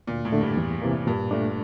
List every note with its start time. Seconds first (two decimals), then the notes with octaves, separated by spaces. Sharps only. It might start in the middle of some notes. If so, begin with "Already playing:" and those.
0.07 D2 A#2
0.25 A2
0.32 D3 A3 D4
0.41 G2
0.57 E2
0.82 C3 E3 A#3
1.07 G2 A#2
1.31 A#2 A3 D4